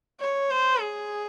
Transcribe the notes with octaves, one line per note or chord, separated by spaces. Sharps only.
C#5
C5
G#4